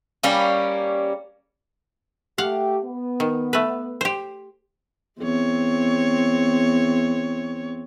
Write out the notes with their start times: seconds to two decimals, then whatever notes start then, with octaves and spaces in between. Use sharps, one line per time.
0.23 G3 A#3 C#4
2.38 A3 G4 F5 F#5
2.84 B3
3.20 D#3
3.53 A3 B4
4.01 G4 C5
5.19 E2 C4 C#5